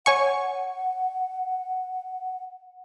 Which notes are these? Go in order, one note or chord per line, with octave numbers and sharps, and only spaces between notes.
C#5 F#5 G#5 C#6